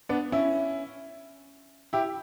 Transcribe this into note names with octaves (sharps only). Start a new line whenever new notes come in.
B3 D4
C#4 E4
E4 G4